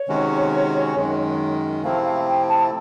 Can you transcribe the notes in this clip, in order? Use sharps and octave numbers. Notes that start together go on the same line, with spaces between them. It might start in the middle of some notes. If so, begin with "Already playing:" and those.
Already playing: C#5
C3 D#3 G#3 C#4 F#4
F#2 D#3 G#3
C3 F3 A3 C4 E4 F5
F5
G5
A5